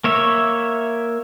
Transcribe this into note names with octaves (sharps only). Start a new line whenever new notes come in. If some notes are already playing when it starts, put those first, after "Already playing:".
A#3 C#5 E5